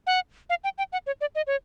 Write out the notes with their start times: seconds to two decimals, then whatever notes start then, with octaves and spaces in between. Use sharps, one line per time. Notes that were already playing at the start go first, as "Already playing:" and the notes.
0.07 F#5
0.50 F5
0.64 G5
0.78 G5
0.93 F#5
1.07 C#5
1.21 D5
1.35 D#5
1.47 C#5